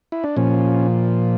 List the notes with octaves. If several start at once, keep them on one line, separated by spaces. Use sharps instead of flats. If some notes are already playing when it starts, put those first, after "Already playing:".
E4
D4
A#2 F3 C#4